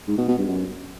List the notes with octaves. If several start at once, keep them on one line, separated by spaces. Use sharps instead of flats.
G#2
B2
B2
G2
F#2